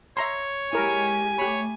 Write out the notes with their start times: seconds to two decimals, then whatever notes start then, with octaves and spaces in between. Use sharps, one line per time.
0.17 C#5 E5 A#5 C6
0.73 G#3 E4 G4 A#4 G#5
1.38 A3 G4 C#5 B5